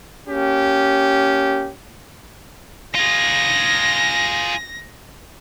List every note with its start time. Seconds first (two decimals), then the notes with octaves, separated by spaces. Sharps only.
0.28 A#3 C#4 G4
2.95 F4 G#4 A#6